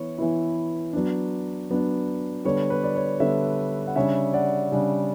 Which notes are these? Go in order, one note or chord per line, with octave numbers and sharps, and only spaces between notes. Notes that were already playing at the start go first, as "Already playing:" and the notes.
Already playing: E3 B3 E4 C#5
E3 B3 E4
F#3 B3 D4
F#3 B3 D4
D3 G3 B3 D4 C#5
B4
D5
C#5
D3 G3 B3 D4 C#5 E5
F#5
C#3 G3 D4 C#5 E5
D5 F#5
C#3 G3 D4